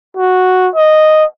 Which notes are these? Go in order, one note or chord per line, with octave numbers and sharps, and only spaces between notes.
F#4
D#5